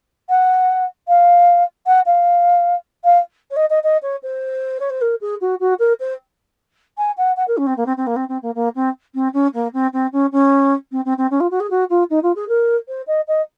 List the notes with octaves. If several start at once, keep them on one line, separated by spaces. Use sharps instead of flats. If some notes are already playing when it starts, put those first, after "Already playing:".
F#5
F5
F#5
F5
F5
C#5
D#5
D#5
D#5
C#5
C5
C#5
C5
A#4
G#4
F#4
F#4
A#4
C5
G#5
F#5
F#5
A#4
C#4
C4
A#3
C4
C4
A#3
C4
C4
A#3
A#3
C4
C4
C#4
A#3
C4
C4
C#4
C#4
C4
C4
C4
C#4
F4
F#4
G#4
F#4
F4
D#4
F4
G#4
A#4
C5
D#5
D#5